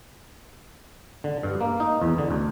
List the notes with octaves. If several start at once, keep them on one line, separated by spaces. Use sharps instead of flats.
D3
G2
A#3
D#4
E2
D3
D2